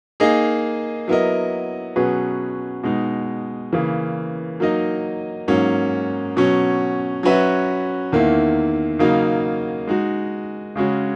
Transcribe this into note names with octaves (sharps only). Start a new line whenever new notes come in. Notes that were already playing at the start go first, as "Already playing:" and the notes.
A#3 D#4 G#4 D#5
F#3 B3 E4 A#4 D#5
B2 F#3 C#4 G#4 B4
B2 G#3 D#4
C#3 E3 A#3
F#3 A#3 D#4 A#4 D#5
G#2 F#3 A#3 C#4
B2 F#3 C#4
F#3 C#4 F#4 B4 E5
E2 D#3 A#3 E4
C#3 F#3 A#3 D#4
G#3 D#4 F#4
C#3 G#3 C#4 F#4